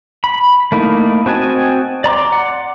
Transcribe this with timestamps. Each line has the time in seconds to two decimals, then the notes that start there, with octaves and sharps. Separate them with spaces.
0.24 B5
0.72 A3 A#3 D#4 E4
1.26 C4 F#4 D#5 G#5 A5
2.04 D5 A#5 C6 D6
2.32 F#5